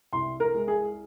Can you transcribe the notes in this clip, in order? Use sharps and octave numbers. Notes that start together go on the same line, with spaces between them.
C2 C6
A#4
G#3
G#4